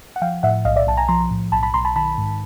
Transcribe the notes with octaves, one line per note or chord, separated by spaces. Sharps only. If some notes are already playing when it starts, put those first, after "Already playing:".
F#5
F3 F5 G5
A2 E5 F#5
B1 D#5 F5
D5 E5
B1 A5
G#5 A#5
F3 A#5 C6
A2
B1 A5 B5
A5 B5
B1 A#5 C6
A5 B5
D#3 A5 B5
G#2